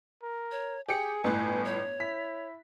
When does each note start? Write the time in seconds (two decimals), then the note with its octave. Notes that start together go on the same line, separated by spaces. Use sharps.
0.22 A#4
0.51 C#5
0.89 G4 G#4 G#5 C#7
1.24 G1 A2 B4
1.65 C#5
2.00 E4 B6